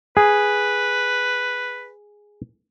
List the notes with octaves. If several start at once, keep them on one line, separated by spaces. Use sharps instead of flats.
G#4 B4